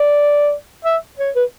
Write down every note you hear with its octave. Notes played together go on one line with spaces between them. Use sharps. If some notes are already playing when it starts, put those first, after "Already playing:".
Already playing: D5
E5
C#5
B4